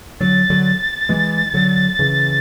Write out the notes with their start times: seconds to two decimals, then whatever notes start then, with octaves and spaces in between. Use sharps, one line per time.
0.20 D3 F#3 A6
0.50 D3 F#3
1.09 E3 G#3
1.54 D3 F#3
1.99 C#3 E3